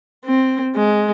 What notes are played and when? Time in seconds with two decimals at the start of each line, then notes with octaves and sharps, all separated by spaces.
0.25 C4
0.76 G#3